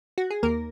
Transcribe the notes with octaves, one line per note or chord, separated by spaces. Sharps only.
F#4
G#4
D#2 A#3 A#4